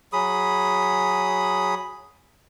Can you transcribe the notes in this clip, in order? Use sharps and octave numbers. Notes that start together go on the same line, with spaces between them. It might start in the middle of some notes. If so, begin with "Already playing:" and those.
F#3 G#4 B5 D#6